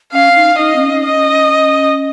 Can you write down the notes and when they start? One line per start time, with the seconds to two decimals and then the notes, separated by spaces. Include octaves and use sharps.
0.13 C#4 F5
0.36 D#4
0.58 D#4 D#5
0.76 C4
0.81 C#4
1.04 D#5